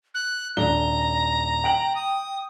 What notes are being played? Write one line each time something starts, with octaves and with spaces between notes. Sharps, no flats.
F#6
D#1 D4 A#5 G7
G5 D7 F#7
D#6